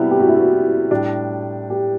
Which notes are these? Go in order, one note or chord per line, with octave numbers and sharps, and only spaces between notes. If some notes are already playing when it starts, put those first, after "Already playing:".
Already playing: C3 G3 B3 E4 F#4
G4
F#4
E4
F#4
A2 G3 D4
G4